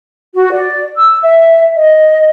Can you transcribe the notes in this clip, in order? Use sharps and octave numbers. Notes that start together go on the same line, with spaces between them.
F#4
D5
E6
E5
D#5